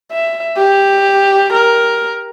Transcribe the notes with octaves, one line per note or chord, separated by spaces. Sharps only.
E5
G4
A#4